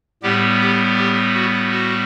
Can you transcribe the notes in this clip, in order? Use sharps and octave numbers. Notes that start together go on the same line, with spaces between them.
A2 G3 B3 G4
G4
G4
F#4
F#4